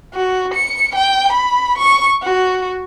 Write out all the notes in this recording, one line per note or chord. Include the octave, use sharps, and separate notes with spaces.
F#4
C#7
G5
B5
C#6
F#4